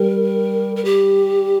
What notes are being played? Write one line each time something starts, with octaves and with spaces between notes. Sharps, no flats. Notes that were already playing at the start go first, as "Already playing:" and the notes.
Already playing: G3 A#4
A#4
G4